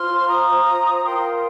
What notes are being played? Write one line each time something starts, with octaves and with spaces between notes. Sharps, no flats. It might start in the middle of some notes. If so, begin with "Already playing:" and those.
Already playing: F4 C5 C6 F6
A#5 D#6
F4 A#4 G5 C6